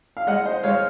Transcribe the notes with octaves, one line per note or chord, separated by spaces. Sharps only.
F5
G#3 D#5 F#5
C5 D#5
G#3 C#5 F5